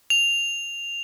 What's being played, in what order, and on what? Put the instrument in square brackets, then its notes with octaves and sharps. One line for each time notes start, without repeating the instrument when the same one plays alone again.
[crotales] F7